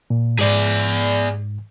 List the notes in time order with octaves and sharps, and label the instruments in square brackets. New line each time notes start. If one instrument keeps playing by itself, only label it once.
[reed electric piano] A#2
[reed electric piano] G#2 [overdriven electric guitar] G#4 D5